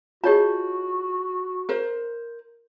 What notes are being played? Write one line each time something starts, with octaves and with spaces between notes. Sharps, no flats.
F4 F#4 G#4 C#5 D#5 A5
A#4 C5